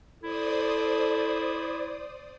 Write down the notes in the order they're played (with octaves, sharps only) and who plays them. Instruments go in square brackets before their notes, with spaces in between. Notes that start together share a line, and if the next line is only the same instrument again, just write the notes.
[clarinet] E4 [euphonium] A4 [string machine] C5 D5 D#6